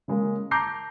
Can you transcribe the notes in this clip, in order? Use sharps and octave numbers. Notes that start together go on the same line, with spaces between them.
C#3 G#3 A#3
A5 A#5 D6 G6 A#6 C7